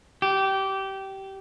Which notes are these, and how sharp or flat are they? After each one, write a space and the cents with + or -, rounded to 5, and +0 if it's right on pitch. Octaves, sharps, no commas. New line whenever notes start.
G4 -20